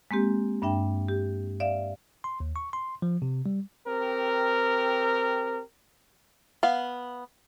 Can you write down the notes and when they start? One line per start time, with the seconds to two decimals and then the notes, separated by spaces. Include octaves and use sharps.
0.11 G#3 A#3 C4 G4
0.62 G2 D4 E5 G5
1.08 G4
1.60 D5 E5 F5
2.24 C6
2.40 D#2
2.56 C#6
2.73 C6
3.02 F3
3.22 C3
3.46 G3
3.87 C4 G4 A#4
6.63 B3 F5